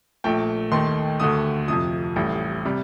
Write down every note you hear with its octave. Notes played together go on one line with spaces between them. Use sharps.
A#1 A#2 A3 G5
D#2 D#3 A3 C6
D2 D3 A3 D#6
F2 C3 F3 D#6
A1 A2 G3
C3 G3